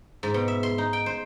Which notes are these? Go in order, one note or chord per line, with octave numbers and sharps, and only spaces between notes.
G#2
B2
E5
C6
D#4
G5
C5